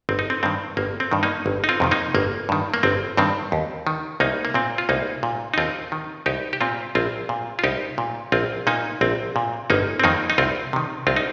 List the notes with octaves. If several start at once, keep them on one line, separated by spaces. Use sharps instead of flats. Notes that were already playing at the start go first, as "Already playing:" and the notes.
G1 C4
D#4
C4
G2 D#3 C4
G1 A#3
C4
G2 D#3
A#3 D#4
G1
D#4
C4 F4
F2 C3 D#3
A#3 D#4
G1 A#3
G2 D#3
A#3
G1 C4
G2 D#3 C4
D#2
D#3
C2 A#3 D#4
A#3
A#2 C4
F4
C2 A#3 D#4
A#2
D#4
D#2 C4 F4
D#3
C2 D#4 G4
G4
A#2 C4 F4
A#1 C4 F4
A#2
F4
C2 D#4 G4
A#2
A#1 C4 F4
A#2 A#3 D#4
A#1 C4
A#2
G1 A#3 D#4
C4
F2 D#3 A#3 D#4
D#4
C2 C4 F4
C3 D#3
C2 C4 F4
D#4